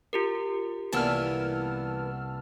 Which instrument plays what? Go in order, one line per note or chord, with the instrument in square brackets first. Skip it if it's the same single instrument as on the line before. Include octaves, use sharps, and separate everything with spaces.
[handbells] F4 G4 A#4
[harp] C2 [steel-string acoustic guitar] E3 A#3 B3 [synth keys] A5 E6 F6